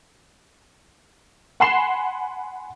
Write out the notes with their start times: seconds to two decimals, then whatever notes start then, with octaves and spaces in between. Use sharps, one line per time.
1.60 F#5 G#5 B5 C6 C7 E7